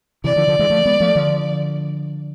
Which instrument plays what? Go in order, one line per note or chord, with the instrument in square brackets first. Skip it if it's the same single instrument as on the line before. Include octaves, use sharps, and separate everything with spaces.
[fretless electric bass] C3 E3 [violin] D5
[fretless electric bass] D3 F3
D3 F3
E3 G#3
F3 A3
G#3 B3
F3 A3
D3 F3